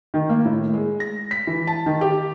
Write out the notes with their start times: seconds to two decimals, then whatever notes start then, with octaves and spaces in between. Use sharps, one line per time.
0.14 D#3
0.29 A#3
0.45 A2
0.73 G#3
1.00 A#6
1.31 B6
1.47 E3
1.67 A5
1.86 D#3
2.01 G4